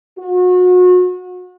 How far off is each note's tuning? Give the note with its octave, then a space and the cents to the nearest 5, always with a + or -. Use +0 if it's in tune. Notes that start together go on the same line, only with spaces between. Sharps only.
F#4 -35